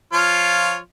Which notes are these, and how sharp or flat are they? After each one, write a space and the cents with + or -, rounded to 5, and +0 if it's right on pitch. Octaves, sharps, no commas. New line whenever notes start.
F3 +0 F4 +0 C#5 +0